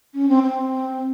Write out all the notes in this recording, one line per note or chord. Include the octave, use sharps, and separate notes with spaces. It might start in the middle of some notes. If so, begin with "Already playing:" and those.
C#4
C4
C4